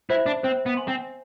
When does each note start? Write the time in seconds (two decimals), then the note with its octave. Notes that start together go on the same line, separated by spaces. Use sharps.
0.10 E4 C5 E5 B5
0.26 D4
0.43 C4 C5
0.66 B3
0.77 G#5 C6
0.88 C4